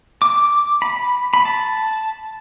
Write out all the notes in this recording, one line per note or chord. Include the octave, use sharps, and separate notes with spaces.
D6
B5
B5
A5